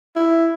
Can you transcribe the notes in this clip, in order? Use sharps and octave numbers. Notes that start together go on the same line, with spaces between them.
E4